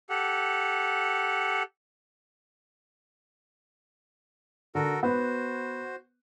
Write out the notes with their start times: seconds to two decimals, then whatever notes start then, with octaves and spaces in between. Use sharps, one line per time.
0.10 G4 A4 F#5
4.75 D3 F#4 A4 A#4
5.03 B3 F#4 C5